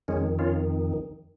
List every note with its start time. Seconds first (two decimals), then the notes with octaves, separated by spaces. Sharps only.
0.08 F2 D#3 G#3 C#4
0.39 C#4 F4